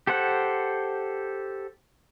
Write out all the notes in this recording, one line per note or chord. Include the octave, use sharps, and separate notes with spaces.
G4 A4 C5 F#5